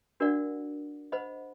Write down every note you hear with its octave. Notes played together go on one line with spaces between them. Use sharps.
D4 F#4 A#4 D5 F#5
C5 D#5 F#5 B5